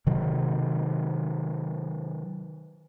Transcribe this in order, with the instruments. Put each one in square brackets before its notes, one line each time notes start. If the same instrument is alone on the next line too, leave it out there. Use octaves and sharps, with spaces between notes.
[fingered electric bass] C3 D#3 F#3